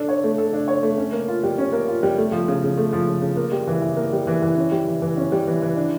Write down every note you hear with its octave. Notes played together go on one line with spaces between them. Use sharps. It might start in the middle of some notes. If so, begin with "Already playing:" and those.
Already playing: D4 A4
C#5
A3
A4
D4
C#5
A3
C#4
A#3
F4
G3
C#4
A#3
F4
G3
A3
F3
C#3
C#3
A3
F3
C#3
C#3
A#3
G3
E3
E3
A#3
G3
E3
E3
C#4
G3
E3
E3
C#4
G3
E3
E3
D4